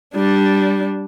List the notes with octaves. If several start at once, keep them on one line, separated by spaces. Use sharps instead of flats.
G3 D4